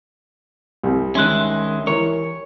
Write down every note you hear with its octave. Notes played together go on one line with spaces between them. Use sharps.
C2
D#3 G#3 C#4 E5 C6 F#6
E3 A#4 C#5